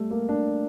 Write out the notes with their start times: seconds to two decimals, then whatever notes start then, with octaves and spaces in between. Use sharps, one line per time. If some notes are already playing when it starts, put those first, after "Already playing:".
Already playing: G3 A3
0.11 A#3
0.29 D4